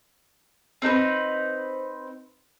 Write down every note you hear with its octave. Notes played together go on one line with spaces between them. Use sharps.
C4 D#4 A4 B4